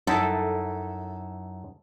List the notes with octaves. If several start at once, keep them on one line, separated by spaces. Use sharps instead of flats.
F#2 D#4 E4 A4